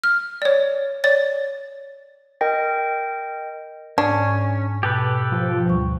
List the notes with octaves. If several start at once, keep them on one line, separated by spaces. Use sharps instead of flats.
F6
C#5 D5
C#5 D5 A6
A#4 D#5 G5 A#6
G#2 C#4 D4
B2 G4 A4 B4
F3
D2 G3 C#6